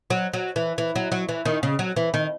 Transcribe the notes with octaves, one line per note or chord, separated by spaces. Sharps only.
F#3
F#3
E3
E3
F#3
F#3
E3
D#3
C#3
F#3
E3
D#3